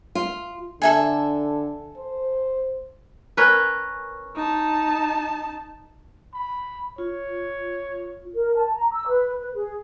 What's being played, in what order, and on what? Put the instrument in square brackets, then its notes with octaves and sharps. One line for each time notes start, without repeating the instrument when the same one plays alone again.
[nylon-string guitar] F4
[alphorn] D3 [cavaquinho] A4 E5 G#5
[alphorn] C5
[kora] C#4 A#4 B4
[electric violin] D#4 A5
[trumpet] B5
[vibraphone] F4 [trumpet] C#5
[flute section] A#4
A5
A#5
E6
B4
B4
G#4